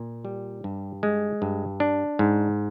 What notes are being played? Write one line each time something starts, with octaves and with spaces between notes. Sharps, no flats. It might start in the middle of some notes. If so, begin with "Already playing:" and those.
Already playing: A#2
G3
G2
G#3
G2
D4
G#2